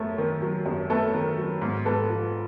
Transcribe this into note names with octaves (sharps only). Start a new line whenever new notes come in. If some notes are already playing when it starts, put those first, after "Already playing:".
Already playing: F#2 A3
D#3
F#3
F#2
A3 A4 B4
D#3 A#4
F#3
G#2
G#2 A4 B4
F3